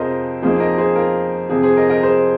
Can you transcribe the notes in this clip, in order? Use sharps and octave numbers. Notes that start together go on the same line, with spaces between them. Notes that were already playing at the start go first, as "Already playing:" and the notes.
Already playing: F2 C3 F3 G#4 A#4 C5 D#5
F2 F3 A#3 D#4 G#4 C5
A#4 D#5
G#4 C5
F4 A#4
F2 C3 F3 G#4
G#4 C5
A#4 D#5
A#4 D#5
G#4 C5